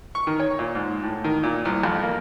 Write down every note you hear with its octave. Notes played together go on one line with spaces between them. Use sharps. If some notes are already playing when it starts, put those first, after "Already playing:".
C#6
D#3
C#5
A#2
G#2
A2
D#3
A#2
C2
F2
A#3